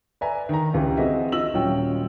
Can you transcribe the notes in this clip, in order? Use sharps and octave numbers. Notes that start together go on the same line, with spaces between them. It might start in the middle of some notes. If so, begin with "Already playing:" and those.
B4 D5 E5 G#5 A#5
D#3 A#5
C#2 E3 G4
E3 C4 F#4 G#4 D#5 E5
F4 D#5 E6 F#7
D#1 F#3 C#4 F4 G5